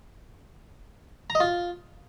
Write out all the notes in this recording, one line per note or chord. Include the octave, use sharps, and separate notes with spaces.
A#5
D#5
F4